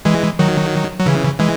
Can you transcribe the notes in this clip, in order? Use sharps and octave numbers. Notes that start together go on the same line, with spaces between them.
E3 G#3
D#3 F#3
F#3
C#3 E3
E3 G#3